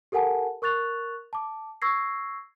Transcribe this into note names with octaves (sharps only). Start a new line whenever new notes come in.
G4 A4 A#4 F#5 G#5 A5
A#4 C#6 F#6 A6 F7
A5 D6
C#6 E6 G#6 A#6 C7